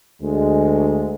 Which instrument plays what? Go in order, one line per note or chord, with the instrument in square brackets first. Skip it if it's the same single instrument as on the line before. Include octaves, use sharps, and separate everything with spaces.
[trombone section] D2 G#3